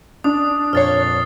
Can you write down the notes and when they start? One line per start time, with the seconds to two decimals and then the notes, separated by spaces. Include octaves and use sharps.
0.24 D4 D#6
0.73 F2 A#2 C#5 F6 A6 C7